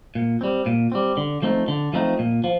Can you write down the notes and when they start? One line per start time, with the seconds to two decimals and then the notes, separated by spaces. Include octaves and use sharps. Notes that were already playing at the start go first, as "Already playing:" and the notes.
0.15 A#2
0.41 G3 C4
0.66 A#2
0.92 G3 C4
1.17 D3
1.42 F3 A3 C4 D#4
1.68 D3
1.93 F3 A3 C4 D#4
2.19 A#2
2.44 F3